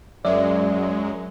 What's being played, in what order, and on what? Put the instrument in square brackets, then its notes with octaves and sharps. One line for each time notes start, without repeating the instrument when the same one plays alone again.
[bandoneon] F#2 [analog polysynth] F#3 G#3 [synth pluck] D5 E5